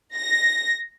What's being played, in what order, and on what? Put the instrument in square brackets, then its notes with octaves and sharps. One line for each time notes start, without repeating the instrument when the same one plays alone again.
[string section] A#6